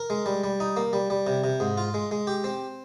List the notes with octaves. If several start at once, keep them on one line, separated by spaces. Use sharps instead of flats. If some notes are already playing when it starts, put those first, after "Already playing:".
Already playing: A#4
G#3
G3
G3
D#4
A#3
G3
G3
C3
C3
G#2
F4
G#3
G#3
G4
C4